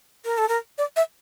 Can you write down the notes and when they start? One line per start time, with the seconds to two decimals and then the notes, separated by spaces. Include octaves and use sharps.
0.25 A#4
0.38 A4
0.48 A#4
0.78 D5
0.96 E5